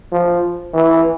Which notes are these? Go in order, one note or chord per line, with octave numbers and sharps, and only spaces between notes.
F3
E3